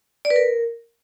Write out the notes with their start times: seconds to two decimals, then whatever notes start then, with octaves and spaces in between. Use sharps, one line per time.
0.25 D5
0.30 B4
0.36 A#4